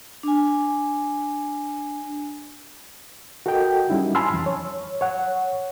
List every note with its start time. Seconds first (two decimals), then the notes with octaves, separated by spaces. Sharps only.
0.23 D4 G#5
3.46 F#4 A4 A#4 D#5 G5
3.90 G3 C#4 D#4 E4
4.15 G#5 A5 B5 C6 E6 F6
4.34 F2 E3
4.46 C#5
5.01 C#5 F#5